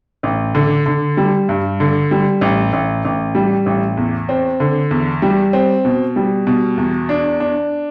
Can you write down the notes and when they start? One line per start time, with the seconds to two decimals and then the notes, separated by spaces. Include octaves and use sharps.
0.23 A1
0.55 D3
0.86 D3
1.17 G3
1.49 G2
1.80 D3
2.11 G3
2.41 A1
2.73 A1
3.05 A1
3.35 G3
3.66 A1
3.97 E2
4.29 C4
4.60 D3
4.91 E2
5.22 G3
5.53 C4
5.85 B2
6.16 G3
6.47 B2
6.77 E2
7.09 D4
7.40 D4